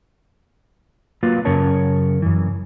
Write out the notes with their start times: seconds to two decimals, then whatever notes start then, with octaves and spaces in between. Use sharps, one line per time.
1.23 F#3 A#3 F4 B4 F5
1.45 F#2 C#3 A#4 C#5 A5
2.22 F#2 E3